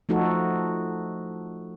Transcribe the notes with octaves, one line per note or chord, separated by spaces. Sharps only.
F3 A3 D#4 F#4 A4